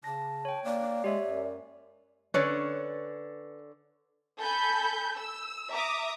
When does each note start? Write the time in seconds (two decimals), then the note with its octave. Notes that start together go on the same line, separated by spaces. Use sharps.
0.04 C#3 A5 A#6
0.45 C#5 G5
0.64 A#3 D5
1.04 G#3 G4 C#5 E5
1.25 F#2
2.34 D3 C#4 B4 C#5 D5
4.39 A4 G#5 B5 G6
5.17 E6
5.72 E5 A#5 D6 D#6